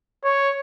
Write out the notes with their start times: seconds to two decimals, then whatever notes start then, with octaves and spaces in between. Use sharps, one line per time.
0.24 C#5